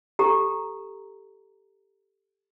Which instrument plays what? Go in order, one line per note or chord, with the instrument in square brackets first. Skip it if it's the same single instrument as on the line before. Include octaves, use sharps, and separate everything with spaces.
[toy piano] G4 A4 A#5